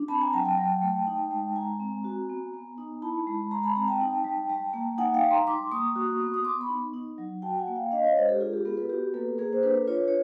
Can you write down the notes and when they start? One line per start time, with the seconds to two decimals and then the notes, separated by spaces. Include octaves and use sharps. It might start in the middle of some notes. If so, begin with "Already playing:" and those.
Already playing: D4
0.08 C4 A5 B5
0.21 G#5 A#5
0.33 F#3 G5 A5
0.45 G5 A5
0.58 F#3
0.82 A3
1.07 D#4
1.31 G#3
1.56 G#3 G#5 A#5
1.80 C4
2.04 F#4
2.29 B3
2.53 B3
2.78 D#4
3.02 E4 A5 B5
3.27 G#3
3.51 G#3 A#5 C6
3.63 A5 B5
3.76 C4 G#5 A#5
3.88 G5 A5
4.01 D#4
4.24 G3
4.49 G3
4.73 A#3
4.98 D#4 F#5 G#5
5.14 F5 G5
5.22 G3
5.31 A#5 C6
5.47 G3 C6 D6
5.71 A#3 C#6 D#6
5.96 F#4
6.20 B3
6.34 D#6
6.44 B3 C6 D6
6.61 B5 C#6
6.69 D#4
6.94 D#4
7.18 F#3
7.42 F#4 G5 A5
7.59 F#5 G#5
7.68 A#3
7.75 F5 G5
7.92 D4 D#5 F5
8.04 C#5 D#5
8.16 G#3 C5 D5
8.28 G4 A4
8.41 F4 G#4 A#4
8.53 G4 A4
8.65 B3 G#4 A#4
8.77 A4 B4
8.89 F#4 G4
9.14 A#3 A4 B4
9.38 A#3 G#4 A#4
9.53 C5
9.63 D4 A4 B4
9.87 F4 B4 C#5
10.08 C#5